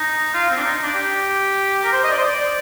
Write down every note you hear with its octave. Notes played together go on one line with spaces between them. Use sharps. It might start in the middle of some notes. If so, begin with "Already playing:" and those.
Already playing: D#4
F4
C4
D4
D#4
D#4
D4
G4
A#4
C5
D#5
D5
C5
D5